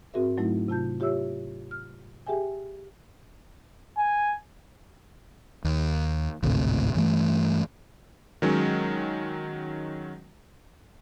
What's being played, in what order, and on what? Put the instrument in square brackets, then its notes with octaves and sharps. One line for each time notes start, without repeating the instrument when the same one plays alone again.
[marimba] G#2 C4 F#4 G#4 A#4 E5
G#2 F#3 A3 D#4 E4
C3 F4 A5 G6
F4 G4 C#5 E5 E6
F6
G4 G#4 E5 G5 G#5
[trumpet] G#5
[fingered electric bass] D#2
G#1 D2 A2 C3
G2 E3 A3
[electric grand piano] D#3 F#3 G#3 C#4